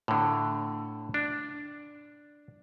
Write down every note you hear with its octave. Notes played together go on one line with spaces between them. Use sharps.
A2 D3
D4